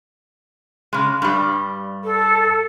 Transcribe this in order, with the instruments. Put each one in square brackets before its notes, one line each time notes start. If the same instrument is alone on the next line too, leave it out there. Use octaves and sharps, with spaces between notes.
[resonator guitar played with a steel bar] C#3 G#3
G2 G3
[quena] A4